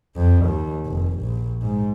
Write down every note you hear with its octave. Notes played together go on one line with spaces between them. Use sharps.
F2
D#2
F1
A#1
G#2